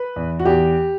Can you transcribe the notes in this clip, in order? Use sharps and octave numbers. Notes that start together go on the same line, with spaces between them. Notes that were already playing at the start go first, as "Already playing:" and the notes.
Already playing: B4
E2
F#4
E2 G4